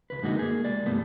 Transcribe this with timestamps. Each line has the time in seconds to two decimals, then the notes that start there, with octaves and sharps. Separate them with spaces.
0.10 C#2 B4
0.22 F#2 D3 G#3 A#3 D#4 F#4
0.39 A#3 G#4
0.64 C2 G#3 D5
0.86 E2 G2 G3 A3 B3